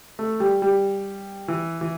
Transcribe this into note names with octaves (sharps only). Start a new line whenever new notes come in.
A3
G3
G3
E3
E3